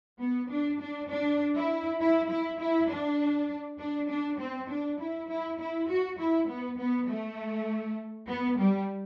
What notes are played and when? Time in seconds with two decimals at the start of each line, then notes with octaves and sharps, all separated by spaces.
0.19 B3
0.49 D4
0.80 D4
1.09 D4
1.55 E4
2.00 E4
2.29 E4
2.59 E4
2.89 D4
3.79 D4
4.09 D4
4.38 C4
4.69 D4
4.99 E4
5.28 E4
5.59 E4
5.88 F#4
6.18 E4
6.47 B3
6.78 B3
7.08 A3
8.27 B3
8.58 G3